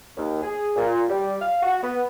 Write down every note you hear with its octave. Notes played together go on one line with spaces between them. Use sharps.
D#2
G#4
A#2
G3
F5
F#4
B3